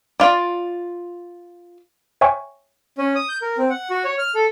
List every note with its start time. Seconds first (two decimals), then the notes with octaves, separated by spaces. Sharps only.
0.20 F4 D5
2.21 C#5 E5 G5 G#5 C#6
2.98 C#4
3.15 D#6
3.29 G6
3.42 A#4
3.58 C4
3.70 F#5
3.90 F#4
4.04 C#5
4.18 F6
4.35 A4